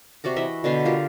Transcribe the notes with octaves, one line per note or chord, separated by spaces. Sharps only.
C3 F#4 D5 A#5
E3 D#5 E5 B5
B2 D3 B4 C6
F4 G4 A#4